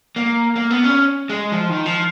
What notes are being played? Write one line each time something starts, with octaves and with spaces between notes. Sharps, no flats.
A#3
A#3
B3
C#4
G#3
F3
D#3
F3